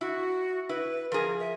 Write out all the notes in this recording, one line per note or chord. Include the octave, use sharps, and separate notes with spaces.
E4 F#4
E4 B4
F3 G#4 A#4
E5